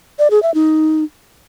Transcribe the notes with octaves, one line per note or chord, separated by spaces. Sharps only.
D5
G#4
E5
D#4